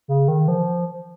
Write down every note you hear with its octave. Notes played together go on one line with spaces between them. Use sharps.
C#3
D#3
F3